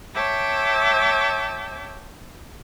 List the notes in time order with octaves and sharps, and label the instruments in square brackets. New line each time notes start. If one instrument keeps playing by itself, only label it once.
[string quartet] C#5 E5 G5 A5 D6